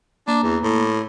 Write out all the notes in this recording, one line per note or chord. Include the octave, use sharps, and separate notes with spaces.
A#3 D4
E2
A2